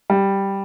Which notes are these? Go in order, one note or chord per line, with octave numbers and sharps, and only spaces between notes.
G3